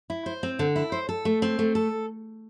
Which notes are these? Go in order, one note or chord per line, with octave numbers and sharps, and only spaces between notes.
E4
C5
C4
D3
E4
C5
A4
A3
C4
A3
A4